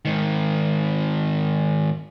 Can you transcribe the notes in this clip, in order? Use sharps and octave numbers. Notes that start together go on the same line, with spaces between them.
G#2 D#3